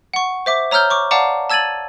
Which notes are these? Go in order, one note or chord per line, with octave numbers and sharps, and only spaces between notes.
F#5 C#6
C5 E5 D6
C#5 A#5 E6 F6 G6 G7
C#6 D6
D5 F5 F#5 A5 A#5 D6
A5 E6 G#6 A6 D#7 F#7